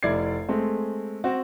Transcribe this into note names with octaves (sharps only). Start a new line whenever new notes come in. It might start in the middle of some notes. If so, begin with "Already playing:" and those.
F1 E4 D5 G#6 C7
G#3 A3 C4
C4 F#4